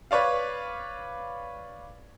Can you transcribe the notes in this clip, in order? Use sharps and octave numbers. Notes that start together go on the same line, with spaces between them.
B4 C#5 D5 F5